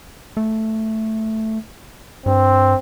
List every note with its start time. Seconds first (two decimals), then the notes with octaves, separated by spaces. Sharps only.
0.37 A3
2.26 G2 C4